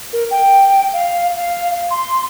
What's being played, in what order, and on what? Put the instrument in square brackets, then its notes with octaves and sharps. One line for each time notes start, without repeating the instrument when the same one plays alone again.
[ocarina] A#4
G5
F5
F5
C6